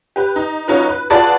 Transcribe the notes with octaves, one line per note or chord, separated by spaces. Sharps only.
G4 B4
D#4
F#3 C#4 D#4 F4 B4
B4
F4 F#4 G#4 B4 D5 A5